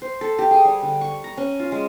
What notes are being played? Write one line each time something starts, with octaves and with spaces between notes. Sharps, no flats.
C5
A4
G4
G#4
G3
D3
C#6
A#5
C#4
F4
G#3